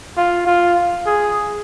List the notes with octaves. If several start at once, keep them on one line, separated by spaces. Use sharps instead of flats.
F4
F4
G#4